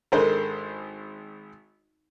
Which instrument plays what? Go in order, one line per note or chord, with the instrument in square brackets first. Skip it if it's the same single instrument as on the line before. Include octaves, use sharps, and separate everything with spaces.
[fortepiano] G#1 G#3 C5 [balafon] D4 A4 A#4